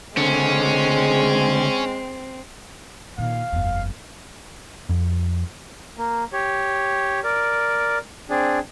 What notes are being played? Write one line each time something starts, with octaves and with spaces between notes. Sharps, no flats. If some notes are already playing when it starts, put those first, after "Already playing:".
C#2 D3 G#3 C4 C#4
A#2 D#3 F5
F#1 E2
F2
A#3
G4 C#5
A#4 D5
C4 D4 G#4